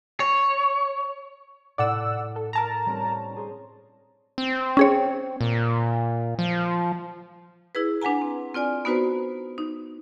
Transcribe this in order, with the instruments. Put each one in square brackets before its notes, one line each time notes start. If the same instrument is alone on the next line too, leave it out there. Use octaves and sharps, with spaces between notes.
[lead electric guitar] C#5
[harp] A2 [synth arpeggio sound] D5 F#5 E6
[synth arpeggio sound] A4
A#4 A5 A#5
[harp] G3 C4 C#4
C4 G#4 C5
[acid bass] C4
[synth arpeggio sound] C#4 G#4 C#5
[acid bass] A#2
F3
[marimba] E4 G#4 B4
D4 B4 F#5 G#5 A#5
C4
C4 F4 D5 G#5
B3 D#4 F#4 B4 C5 A#5
D#4